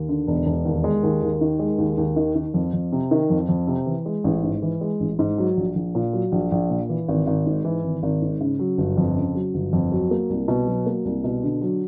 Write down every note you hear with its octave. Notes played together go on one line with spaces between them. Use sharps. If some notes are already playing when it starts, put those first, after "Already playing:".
Already playing: D#2
D3
E1
E1
D#2
G#3
D#2
D#2
D#3
G#3
D#2
D#2
D#3
D#3
F2
F2
C3
D#3
F2
F2
C3
E3
G#3
A1
G#2
E3
G#3
A1
G#2
F#3
A#1
A#1
A#2
F#3
A#1
A#1
A#2
E3
G#1
G#1
G#2
E3
G#1
G#1
G#2
C#3
F#3
G1
F2
C#3
F#3
G1
F2
F#3
A#3
C2
B2
F#3
A#3
C2
B2
D3
F#3